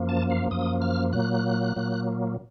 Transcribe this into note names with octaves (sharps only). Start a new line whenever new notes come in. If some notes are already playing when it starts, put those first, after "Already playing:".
Already playing: F#2 F3 A#3
A5
F5
F#2 F3 A#3 D#6
F6
A#2 F#3 A#3 F#6
A#2 F#3 A#3